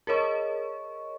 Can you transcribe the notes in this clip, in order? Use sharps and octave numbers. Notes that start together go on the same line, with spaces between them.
G#4 A#4 C#5 D#5 C#6